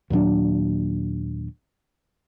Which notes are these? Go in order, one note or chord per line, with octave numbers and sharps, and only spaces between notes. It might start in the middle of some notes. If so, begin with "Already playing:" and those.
D#2 A#2 F#3 D4